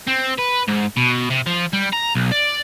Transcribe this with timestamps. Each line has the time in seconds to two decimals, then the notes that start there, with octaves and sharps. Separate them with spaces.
0.08 C4
0.39 B4
0.68 G#2
0.97 B2
1.30 C3
1.46 F3
1.73 G3
1.93 A#5
2.15 B1
2.32 D5